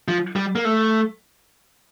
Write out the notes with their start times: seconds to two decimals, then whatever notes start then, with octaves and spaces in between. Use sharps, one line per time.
0.08 F3
0.36 G3
0.55 A#3
0.65 A3